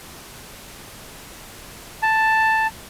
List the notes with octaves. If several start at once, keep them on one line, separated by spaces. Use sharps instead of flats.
A5